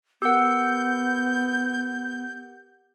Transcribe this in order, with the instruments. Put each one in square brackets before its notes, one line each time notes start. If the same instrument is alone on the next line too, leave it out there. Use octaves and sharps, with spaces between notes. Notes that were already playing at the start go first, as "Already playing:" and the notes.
[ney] B3 [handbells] G4 F#5 [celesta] A#4 E6 [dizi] G6